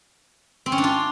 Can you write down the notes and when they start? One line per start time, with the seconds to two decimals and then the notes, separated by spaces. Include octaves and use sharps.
0.66 C4
0.72 C#4
0.78 D4
0.84 F4